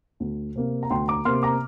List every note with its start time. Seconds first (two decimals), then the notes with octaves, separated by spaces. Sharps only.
0.20 D2
0.56 C3 A#3
0.83 A#5
0.90 D2 G5 C6
1.08 A#5 D6
1.25 C3 A#3 C6 F6
1.43 A#5 D6